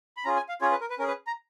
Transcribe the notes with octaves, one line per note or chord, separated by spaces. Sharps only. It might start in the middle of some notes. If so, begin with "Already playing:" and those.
B5
C#4 F4 G#4 A#5
G#5
F5
C#4 F4 G#4 C#5
B4
A#4
B4
C#4 G#4 A#4 B4
A#5